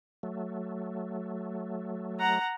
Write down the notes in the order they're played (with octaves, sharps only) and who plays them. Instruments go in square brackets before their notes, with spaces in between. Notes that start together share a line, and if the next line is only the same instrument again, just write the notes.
[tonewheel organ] F#3 A3
[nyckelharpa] F#5 A#5